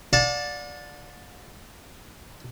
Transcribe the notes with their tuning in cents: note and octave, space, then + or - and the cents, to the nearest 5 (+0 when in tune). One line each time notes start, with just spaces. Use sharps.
D5 +0 F#5 -45 A5 +0